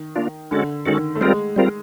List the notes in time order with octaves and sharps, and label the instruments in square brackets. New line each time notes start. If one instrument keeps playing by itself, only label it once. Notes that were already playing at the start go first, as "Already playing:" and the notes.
Already playing: [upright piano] D#3
[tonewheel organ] A#3 D4 F4
[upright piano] D3 [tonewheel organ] G#3 C#4 F#4 A4
[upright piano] D#3 [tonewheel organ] G#3 C#4 F#4 A4
[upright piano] A3
[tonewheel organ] G3 C4 F4 A#4 [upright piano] G#3
[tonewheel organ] G3 C4 F4 A#4